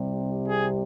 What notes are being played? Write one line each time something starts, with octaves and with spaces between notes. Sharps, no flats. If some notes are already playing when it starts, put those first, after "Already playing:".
Already playing: C2 C3 G3
G#4